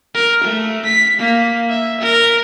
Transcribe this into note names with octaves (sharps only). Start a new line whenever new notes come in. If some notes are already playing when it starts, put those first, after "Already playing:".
A#4
A3
B6
A#3
E5
A#4